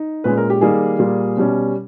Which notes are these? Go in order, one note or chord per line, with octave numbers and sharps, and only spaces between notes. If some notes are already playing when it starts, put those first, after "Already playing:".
Already playing: D#4
A#2 G#3 C#4 B4
A#4
G4
D#3 G3 A#3 D#4 G#4
A#2 G3 A#3
B2 G3 C#4